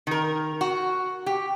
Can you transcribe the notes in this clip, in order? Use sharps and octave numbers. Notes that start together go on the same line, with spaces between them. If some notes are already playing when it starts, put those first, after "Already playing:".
D#3 A#4
F#4
G4